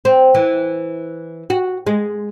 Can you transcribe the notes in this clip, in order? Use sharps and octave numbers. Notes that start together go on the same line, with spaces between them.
C4
E3
F#4
G#3